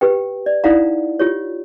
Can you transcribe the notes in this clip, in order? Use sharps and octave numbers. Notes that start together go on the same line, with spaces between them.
G4 B4 G5
D5
D#4 E4 D5 F5 F#5 A#5
F4 G4 C#5